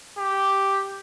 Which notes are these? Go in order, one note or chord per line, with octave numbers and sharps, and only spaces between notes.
G4